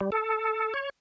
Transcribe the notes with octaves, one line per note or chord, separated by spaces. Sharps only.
G3
A4
C#5